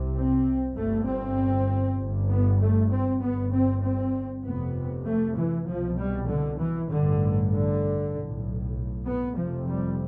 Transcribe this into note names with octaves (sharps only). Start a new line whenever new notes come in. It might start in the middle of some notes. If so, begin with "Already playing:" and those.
Already playing: C2 C3
C4
G1 G2 A3
C4
G1 G2
B3
A3
C4
G1 G2 B3
C4
C4
F1 F2 C3 B3
A3
E3
C2 B2 F3
G3
D3
E3
A1 G2 D3
D3
B1 A2
B3
F1 F2 C3 F3
G3